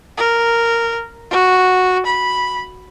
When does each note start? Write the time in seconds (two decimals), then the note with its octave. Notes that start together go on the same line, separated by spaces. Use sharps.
0.17 A#4
1.31 F#4
2.06 B5